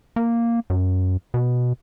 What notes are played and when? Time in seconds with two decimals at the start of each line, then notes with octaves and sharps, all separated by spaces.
0.16 A#3
0.70 F#2
1.34 B2